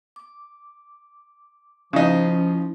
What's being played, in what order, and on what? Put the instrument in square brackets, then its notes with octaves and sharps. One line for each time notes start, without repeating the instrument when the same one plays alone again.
[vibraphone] D6
[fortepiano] C#3 D#4 [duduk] F3 [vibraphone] C#4 C5 [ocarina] E4